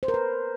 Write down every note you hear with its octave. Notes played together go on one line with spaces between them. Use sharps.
C5
A#4
B4